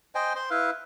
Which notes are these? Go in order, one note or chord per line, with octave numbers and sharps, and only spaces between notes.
C5 D#5 G5 G#5
C5 C6
E4 B4 F5